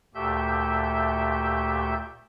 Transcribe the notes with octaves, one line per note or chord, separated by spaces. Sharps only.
D2 A#2 A3 G4 E5 G6